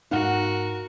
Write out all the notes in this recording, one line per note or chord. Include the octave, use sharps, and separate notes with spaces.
G#2 B3 D#4 F#4 A#4 F5 F#5